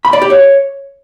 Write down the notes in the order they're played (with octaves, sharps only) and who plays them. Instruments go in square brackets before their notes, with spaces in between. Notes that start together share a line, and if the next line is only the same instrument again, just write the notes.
[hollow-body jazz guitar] B5
D5
G4
C#5